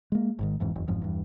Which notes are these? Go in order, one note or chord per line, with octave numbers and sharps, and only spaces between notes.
G#3 A#3
G#1 G#2 D#3
F#1 F2 G#2 E3
F#1 E2
G1 F2 G#2 F3
E2 G2